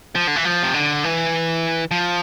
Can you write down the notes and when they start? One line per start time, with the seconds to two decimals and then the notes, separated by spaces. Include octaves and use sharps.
0.15 F3
0.27 D3
0.36 E3
0.45 F3
0.63 C3
0.74 D3
1.04 E3
1.91 F3